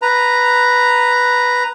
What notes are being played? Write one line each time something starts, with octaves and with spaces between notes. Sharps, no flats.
B4 A#5